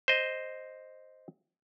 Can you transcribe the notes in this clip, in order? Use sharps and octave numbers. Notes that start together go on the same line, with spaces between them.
C5 D#5